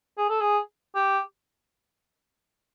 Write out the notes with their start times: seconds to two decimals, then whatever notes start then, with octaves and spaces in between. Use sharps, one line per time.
0.18 G#4
0.30 A4
0.41 G#4
0.95 G4